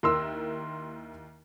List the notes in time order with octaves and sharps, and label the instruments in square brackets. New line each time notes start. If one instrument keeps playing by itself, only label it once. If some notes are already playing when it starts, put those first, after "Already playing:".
[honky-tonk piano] D#2 E4 [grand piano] A#4 C6 E6